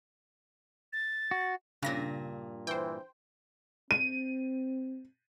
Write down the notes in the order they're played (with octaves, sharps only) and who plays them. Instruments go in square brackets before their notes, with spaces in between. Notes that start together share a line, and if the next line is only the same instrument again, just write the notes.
[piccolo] A6
[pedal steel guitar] F#4
[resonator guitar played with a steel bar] G2 A#2 [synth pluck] C#3 A#6
[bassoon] E3 [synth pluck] C5 G5
[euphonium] C4 [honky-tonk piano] D#7